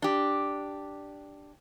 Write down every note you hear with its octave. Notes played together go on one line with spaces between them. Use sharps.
D4 G4